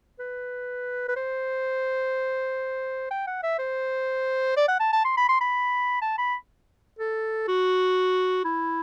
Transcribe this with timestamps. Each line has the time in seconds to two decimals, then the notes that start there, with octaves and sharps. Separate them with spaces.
0.19 B4
1.08 B4
1.16 C5
3.11 G5
3.27 F#5
3.43 E5
3.59 C5
4.57 D5
4.68 F#5
4.80 A5
4.93 A5
5.05 C6
5.17 B5
5.29 C6
5.41 B5
6.01 A5
6.18 B5
6.99 A4
7.48 F#4
8.45 E4